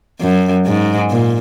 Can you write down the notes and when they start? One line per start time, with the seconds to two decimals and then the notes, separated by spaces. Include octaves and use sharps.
0.21 F#2
0.66 G#2
1.10 A#2